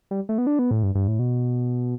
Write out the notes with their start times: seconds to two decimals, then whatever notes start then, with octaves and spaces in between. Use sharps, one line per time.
0.11 G3
0.29 A3
0.38 B3
0.47 D4
0.59 B3
0.71 A2
0.83 G2
0.95 G2
1.08 A2
1.19 B2